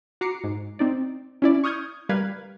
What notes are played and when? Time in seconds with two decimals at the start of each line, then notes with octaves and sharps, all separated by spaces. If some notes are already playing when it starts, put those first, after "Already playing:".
0.21 F#4 A#5 D6 C7 C#7
0.44 G#2
0.79 C4 D#4 D5
1.42 C#4 E4 D5
1.64 C#6 D#6 F6 G6 G#6
2.09 G3 A#4 B4 F5 G#6